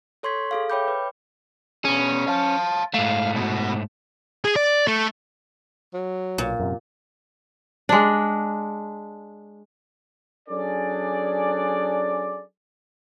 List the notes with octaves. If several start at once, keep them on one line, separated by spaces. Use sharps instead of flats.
A4 C#5 C6 C#6 G#6 B6
G#4 A4 F5
C#5 E5 G5 B5 D6 G6
B4
B2 C#4 G#4
F5 A5
G#2 A3 F5
B2 F#4
G#4
D5
A3
F#3
B1 A#2
F#2 C3
G#3 D4
F#3 C#4 D4 G#4 A4 D5